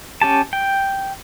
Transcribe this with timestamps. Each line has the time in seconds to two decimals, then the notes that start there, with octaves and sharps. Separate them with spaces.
0.21 C#4 G4 A5
0.53 G5